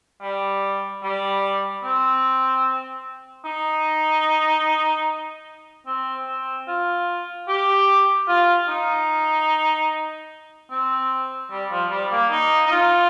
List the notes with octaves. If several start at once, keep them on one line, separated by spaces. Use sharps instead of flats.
G3
G3
C4
D#4
C4
C4
F4
G4
F4
D#4
C4
G3
F3
G3
A#3
D#4
D#4
F4